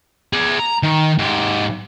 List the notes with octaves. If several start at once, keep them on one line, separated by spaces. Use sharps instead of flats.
G#4 D5
A#5
D#3
G#2 G4